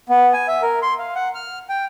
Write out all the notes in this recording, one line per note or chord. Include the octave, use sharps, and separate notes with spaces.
B3
G#5
E5
A#4
C6
F5
F#5
F6
G5